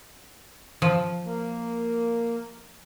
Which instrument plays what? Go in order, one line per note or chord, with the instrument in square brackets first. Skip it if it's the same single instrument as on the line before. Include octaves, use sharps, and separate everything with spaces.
[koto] F3
[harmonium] A#3